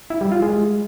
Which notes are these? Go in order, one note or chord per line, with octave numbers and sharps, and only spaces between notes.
E4
G3
F4
G#3